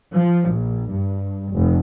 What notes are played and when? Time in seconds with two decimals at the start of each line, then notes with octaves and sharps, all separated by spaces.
0.12 F3
0.46 A#1
0.88 G2
1.51 F1